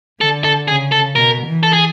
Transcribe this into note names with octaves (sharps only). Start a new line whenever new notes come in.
D3 A4
A4
C#3 G#4
A4
B2 A#4
E3
A4
G#4